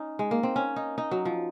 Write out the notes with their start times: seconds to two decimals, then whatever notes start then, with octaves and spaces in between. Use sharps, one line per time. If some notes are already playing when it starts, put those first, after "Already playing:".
Already playing: C#4 D#4
0.19 G#3
0.31 A#3
0.43 C4
0.56 C#4
0.76 D#4
0.98 D#4
1.11 F#3
1.25 F3